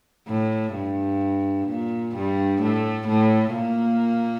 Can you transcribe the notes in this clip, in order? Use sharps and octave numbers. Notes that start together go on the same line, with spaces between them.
A2
G2
A#2
G2 G3
A2 A3
A2 A3
A#2 A#3